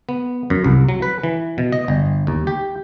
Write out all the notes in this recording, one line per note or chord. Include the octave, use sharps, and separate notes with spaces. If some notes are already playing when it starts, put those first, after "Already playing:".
B3
F#2
C2
F#3
B4
E3
B2
D#5
G1
D#2
G4